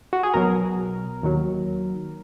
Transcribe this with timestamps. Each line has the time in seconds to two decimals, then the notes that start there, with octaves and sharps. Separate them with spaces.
0.13 F#4
0.23 G#4
0.34 B1 B2 F#3 A#4
1.23 D#2 D#3 F#3